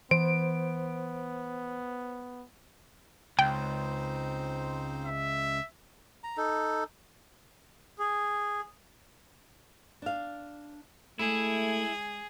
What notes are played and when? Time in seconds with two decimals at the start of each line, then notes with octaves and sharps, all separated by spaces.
0.11 E3 B3 C5 D7
3.39 C#2 C4 D#4 C5 G5
5.06 E5
6.24 A#5
6.37 D#4 A4
7.99 G#4
10.02 D4 F5
11.19 G#3 A3 E4 G#4